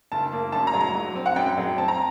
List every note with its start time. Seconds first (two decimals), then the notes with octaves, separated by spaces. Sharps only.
0.12 F#1 A5
0.32 A#3
0.52 F#2 A5
0.67 A#5
0.74 F#3
0.81 A#5
0.95 F#3
1.15 C4
1.26 F#5
1.36 F#2 G5
1.58 F#3
1.78 C4 A5
1.88 A#5